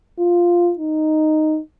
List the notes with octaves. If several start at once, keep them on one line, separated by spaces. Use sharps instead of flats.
F4
D#4